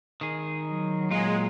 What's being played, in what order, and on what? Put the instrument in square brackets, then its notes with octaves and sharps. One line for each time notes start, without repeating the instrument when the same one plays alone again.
[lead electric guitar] D#3 G#4
[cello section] F#3
[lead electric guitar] A#2 F4 [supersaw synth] G#3